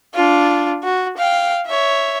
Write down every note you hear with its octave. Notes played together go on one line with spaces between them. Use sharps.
D4 F4
F#4
F5 G5
C#5 E5